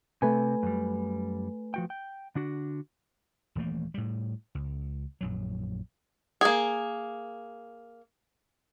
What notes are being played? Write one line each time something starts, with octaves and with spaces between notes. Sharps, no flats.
C3 A3 B4 G#5
F#2 G3
F3 F#4 G5
G5
D3 D4 F#4
D#1 E3 A3 A#3
A2 G3
C#2
A#1 F#2 F#3
A#3 G#4